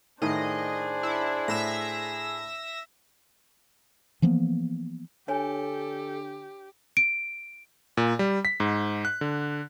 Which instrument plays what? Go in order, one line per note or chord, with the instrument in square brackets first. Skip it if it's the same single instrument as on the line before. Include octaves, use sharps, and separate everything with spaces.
[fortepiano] A2 D#3 [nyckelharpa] D4 C5 [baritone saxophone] G#4 [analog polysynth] D#5
[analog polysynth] E4
[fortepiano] A2 [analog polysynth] E5 E6 A#6
[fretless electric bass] E3 F3 A#3 B3
[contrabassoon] D3 [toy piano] D4 C#5 G#5 [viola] G4 [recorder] A4
[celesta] D7
[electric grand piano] A#2
G3
B6
G#2
F#6
D3